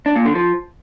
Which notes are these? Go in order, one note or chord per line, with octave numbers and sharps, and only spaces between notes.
D4
A#2
D3
F3